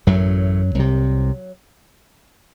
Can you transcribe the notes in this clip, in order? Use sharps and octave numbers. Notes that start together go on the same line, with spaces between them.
A1 F#2 A2 F#3
C2 C3